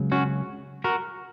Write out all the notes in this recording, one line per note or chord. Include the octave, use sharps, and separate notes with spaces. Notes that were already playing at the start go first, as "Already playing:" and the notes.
Already playing: C#2 C#3 F#3
C#4 F#4
F#4 A#4